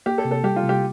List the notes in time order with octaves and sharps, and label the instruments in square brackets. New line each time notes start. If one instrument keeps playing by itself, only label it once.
[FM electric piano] A#3 [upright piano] G4
[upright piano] A4
[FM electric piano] C3
[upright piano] A4
[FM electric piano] G3 [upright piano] G4
[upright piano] F4
[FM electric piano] C3
[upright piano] G4